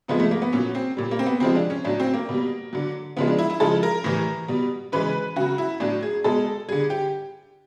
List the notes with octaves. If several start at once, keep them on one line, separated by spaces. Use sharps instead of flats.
C3 F3 G#3 B3
A3
A#3
B3
A#2 F#3 C#4
C4
A#2 G3
A#3
C4
B3
C3 F3 G#3 C4
D4
C#4
A2 F#3 D4
C4
A#3
B2 G3
D3 F#3
C#3 F3 G#3 B3
D4
E4
E4
C#3 F3 G#3 A4
A#4
A2 E3 G3
B2 G3
C#3 E3 G#3 B4
C#3 F#3 F#4
E4
A2 F#3 D4
G#4
B2 G#3 A4
D3 G3 G#4
G4